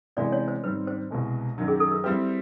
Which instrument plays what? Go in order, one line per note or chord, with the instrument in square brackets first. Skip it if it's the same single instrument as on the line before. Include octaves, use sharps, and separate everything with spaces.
[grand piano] C3 E3 G#3 B3 [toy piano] D5
[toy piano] C#5
C5
[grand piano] G#2 D#3 G3 C4 [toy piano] B4
[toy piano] C5
[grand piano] C2 B2 G#3
F#2 D#3 F#3
[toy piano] G#4
A4
A#4
[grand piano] G3 C4 E4 G4 [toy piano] B4